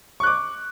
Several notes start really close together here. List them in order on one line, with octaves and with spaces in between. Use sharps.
C#6 F#6 D6